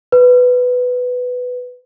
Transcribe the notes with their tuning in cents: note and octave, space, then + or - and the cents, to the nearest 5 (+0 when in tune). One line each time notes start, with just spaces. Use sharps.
B4 +10